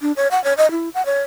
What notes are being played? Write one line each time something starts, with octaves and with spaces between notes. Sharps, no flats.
D4
C#5
F#5
C#5
D#5
E4
F#5
C#5